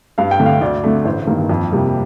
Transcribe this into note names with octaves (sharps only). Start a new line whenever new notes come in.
G2 F5
G5
D3 A3
F5
D2 D5
D3 A3
A1 C5
G2 D#3 A#3
F2
C3 G3 A#3